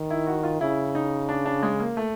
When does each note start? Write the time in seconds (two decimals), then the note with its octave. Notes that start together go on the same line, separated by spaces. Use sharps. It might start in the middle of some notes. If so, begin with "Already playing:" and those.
Already playing: D#3
0.10 E4
0.27 F#4
0.43 F4
0.61 C#3 E4
0.95 D#4
1.29 D4
1.46 D4
1.63 G#3
1.80 A#3
1.97 A3